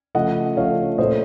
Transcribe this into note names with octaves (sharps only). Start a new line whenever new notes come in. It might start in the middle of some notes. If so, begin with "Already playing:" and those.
C#3 F3 A3 D#5 F#5
C#3 F3 A3 C#5 F5
A#2 A3 C5 D#5